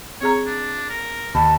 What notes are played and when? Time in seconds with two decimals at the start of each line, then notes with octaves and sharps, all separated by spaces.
0.21 C4 G#4 C#5 A#5
0.46 D4
0.90 A#4
1.35 D#2 A5 B5